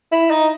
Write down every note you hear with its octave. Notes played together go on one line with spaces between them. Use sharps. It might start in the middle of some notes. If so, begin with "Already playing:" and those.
E4
D#4